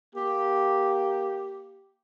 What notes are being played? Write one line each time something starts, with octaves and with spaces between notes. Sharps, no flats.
A#3 G4